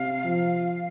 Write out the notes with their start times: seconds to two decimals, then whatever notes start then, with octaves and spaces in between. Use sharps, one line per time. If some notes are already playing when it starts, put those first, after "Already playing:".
Already playing: C3 F5
0.24 F3